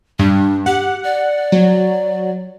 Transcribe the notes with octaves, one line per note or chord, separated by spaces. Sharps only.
G2 D4
G4 F#5
D5
F#3